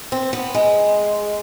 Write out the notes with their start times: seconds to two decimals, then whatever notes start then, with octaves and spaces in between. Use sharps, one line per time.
0.12 C4
0.33 B3
0.55 G#3